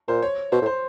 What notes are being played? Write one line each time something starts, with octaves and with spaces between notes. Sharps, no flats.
A#2 C5
C#5
B2 C5
A2
C5